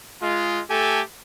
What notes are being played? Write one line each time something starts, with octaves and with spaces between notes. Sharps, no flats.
G#3 F4
A3 G4 A4 G#5